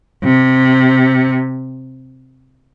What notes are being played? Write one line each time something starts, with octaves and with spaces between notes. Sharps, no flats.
C3